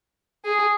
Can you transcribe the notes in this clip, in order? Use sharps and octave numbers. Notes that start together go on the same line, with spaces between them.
G#4